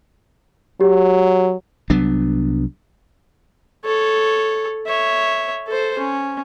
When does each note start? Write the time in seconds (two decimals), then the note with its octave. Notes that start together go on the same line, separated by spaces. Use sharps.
0.81 F#3 G4
1.90 C2 F#3 B3 D4
3.85 A4 C#5
4.87 C#5 E5
5.68 A4 C5
5.98 C#4